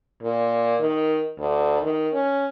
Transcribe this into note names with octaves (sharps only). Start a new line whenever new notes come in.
A#2
D#3
D2
D#3
C#4